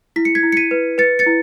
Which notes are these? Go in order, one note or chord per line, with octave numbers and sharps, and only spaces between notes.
E4 B6
C#7
G#6 B6
E4
C#7
B6 D#7
B4
B4 A6 C#7
A6 C#7
E4